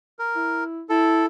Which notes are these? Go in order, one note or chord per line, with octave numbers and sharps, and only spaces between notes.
A#4
E4
E4 A4